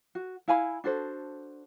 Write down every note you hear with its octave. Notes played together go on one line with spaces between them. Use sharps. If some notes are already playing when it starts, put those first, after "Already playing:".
F#4
E4 F5 G#5 B5
D4 F#4 A4 C5